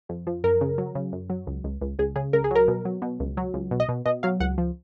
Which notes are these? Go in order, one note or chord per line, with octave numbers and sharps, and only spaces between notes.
F2
F3
F#2 A#4
C#3
F#3
C#3
F#2
F#3
C#2
C#2
C#2
C#2 G#4
C#3 G#4
C#2 A#4
G#4
F#3 A#4
B2
F#3
B2
C#2
F#3
C#2
B2
D#5
B2
B2 D#5
F#3 F5
C#2 F#5
F3